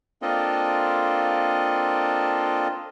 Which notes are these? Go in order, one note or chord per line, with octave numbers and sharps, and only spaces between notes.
A#3 C4 D4 F4 A4 D#5